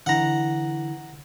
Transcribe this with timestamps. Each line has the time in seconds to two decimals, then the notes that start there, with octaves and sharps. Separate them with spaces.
0.06 D3 E3 F#5 A#5